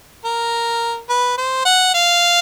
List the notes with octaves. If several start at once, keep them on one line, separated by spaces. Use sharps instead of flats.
A#4
B4
C5
F#5
F5